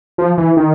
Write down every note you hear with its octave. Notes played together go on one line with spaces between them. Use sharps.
F3
E3
D#3